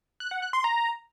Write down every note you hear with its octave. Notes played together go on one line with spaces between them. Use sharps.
F#6
F#5
F#6
C6
A#5